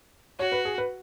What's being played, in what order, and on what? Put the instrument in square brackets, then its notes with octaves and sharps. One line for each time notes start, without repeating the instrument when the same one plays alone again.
[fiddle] F#4 [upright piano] C#5
[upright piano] B4
G#4
B4